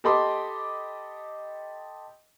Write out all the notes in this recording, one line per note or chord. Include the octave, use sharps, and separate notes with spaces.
G4 A4 D#5 B5 C6 D6